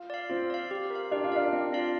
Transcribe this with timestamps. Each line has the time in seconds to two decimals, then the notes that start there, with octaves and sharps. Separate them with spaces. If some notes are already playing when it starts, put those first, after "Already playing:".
Already playing: F4
0.10 D5 F5
0.30 C4 F4
0.50 D5 F5
0.71 G4
0.90 A#4 F5
1.11 D4 G4
1.24 F4
1.32 D4 A#4 F5
1.53 C4
1.72 F4 D5 F5